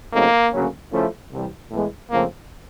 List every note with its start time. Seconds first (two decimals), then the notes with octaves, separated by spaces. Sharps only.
0.12 C#3 F#3 A3 A#3 C4 D#4
0.52 D2 C#3 F#3 A#3 C#4
0.91 C#3 F3 A3 C#4 E4
1.31 C2 C3 E3 G3
1.71 A2 E3 G#3 B3
2.10 F2 C#3 F3 A3 A#3 C4